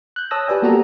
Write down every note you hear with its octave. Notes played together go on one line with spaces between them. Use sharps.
F#6 G6
C#5 A5 D#6 E6 A#6
G4 B4 D5 G#5
A#3 B3 F#4 G4 A4 A#5